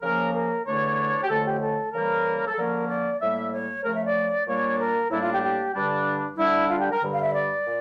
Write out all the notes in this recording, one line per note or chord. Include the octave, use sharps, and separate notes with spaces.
C#3 F3 A#3 C#4 A#4
A#4
E2 D3 A3 D4 C#5
G4
F2 D3 A3 C#4 A4
G4
A4
C#3 E3 G3 A#3 A#4
A4
D3 F3 A#3 C#4 A#4
D5
A2 G3 A#3 E5
C#5
C#3 F3 A3 A#4
E5
D5
A#2 G3 A#3 D4 C#5
A#4
A2 G3 A#3 D4 E4
F4
G4
G4
G2 D3 G3 D4
D3 G3 D4 E4
F4
G4
A#4
G2 D3 G3
F5
E5
D5
A#2